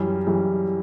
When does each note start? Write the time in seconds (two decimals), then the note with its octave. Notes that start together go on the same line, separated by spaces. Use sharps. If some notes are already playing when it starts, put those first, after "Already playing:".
Already playing: F#2 E3 G3
0.27 F#2 E3 G3